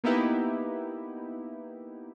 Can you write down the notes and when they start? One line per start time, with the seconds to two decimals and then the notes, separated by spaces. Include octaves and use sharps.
0.04 A#3 B3 D#4 E4 G4 B4